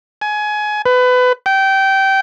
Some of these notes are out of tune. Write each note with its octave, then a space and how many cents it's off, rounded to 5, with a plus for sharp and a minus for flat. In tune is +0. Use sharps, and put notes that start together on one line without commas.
G#5 +20
B4 +25
G5 -20